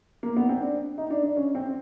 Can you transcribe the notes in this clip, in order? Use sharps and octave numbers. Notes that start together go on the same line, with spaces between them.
A#3
B3
C4
D4
D#4
D4
D4
C#4
C4